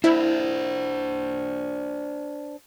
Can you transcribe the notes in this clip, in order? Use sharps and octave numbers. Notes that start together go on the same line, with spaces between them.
D4 E4 C5